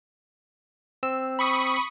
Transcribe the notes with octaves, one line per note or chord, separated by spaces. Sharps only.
C4 E6
B5 C#6 D#6